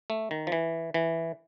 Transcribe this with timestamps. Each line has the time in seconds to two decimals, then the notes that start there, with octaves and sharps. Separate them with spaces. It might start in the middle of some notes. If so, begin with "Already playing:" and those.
0.10 A3
0.31 D#3
0.47 F3
0.52 E3
0.94 E3